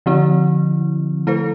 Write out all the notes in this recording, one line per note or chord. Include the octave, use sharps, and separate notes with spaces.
D3 F3 C4 E4
A3 E4 A4 C5